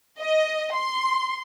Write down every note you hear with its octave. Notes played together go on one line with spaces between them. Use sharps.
D#5
C6